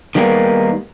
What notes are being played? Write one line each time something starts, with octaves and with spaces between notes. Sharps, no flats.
D#3 G3 G#3 A#3 B3